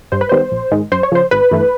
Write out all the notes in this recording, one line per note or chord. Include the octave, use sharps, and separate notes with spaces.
G2 C5
B4
D#3 G3 B3 C5
A#1
G#2 D#3 G#3
F#2 C5
C#5
C#3 F3 C5
G#1 B4
G2 E3 A3